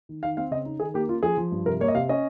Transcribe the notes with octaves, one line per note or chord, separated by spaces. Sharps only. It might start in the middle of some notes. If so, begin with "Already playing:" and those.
D#3
D#3 F5
C4 F5
C#3 D#5
D#4
D#3 G#4
A#3 G4
C#4 F4
F3 G#4
F3
G2
C3 A#4
A#3 C#5
D#5
C3 F5
C#4 D#5